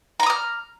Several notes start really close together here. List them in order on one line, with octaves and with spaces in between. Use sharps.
A#5 B5 D#6 F6